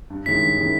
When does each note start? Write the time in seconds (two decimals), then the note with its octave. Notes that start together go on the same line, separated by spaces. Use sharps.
0.10 G2
0.26 D#3 G#3 C#4 E4 B6
0.42 G2
0.58 D#3 G#3 C#4 E4